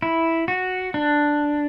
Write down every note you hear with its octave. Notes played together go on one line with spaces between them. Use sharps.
E4
F#4
D4